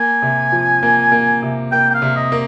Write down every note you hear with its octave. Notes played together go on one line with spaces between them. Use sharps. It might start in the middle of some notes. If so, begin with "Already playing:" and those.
Already playing: A#3 G#5
C3
F3
A#3
A#3
C3
A#3 G5
G5
F5
C3
D#5
A#3